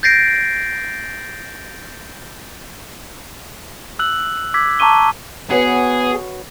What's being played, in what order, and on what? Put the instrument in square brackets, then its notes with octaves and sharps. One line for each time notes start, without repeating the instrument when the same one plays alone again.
[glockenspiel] G6 A6 A#6 C7 D7
E6 F#6 F#7
D6 E6 G#6 B6
A5 A#5 C#6 D6 D#7 G7
[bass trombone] B3 [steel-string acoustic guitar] F#4 B4 C#5 [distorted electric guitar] G#4